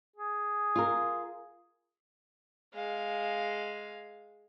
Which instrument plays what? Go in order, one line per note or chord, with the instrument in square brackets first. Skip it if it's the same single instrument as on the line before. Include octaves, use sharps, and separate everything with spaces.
[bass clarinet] G#4
[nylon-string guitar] F4 A#4
[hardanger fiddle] G#3 F5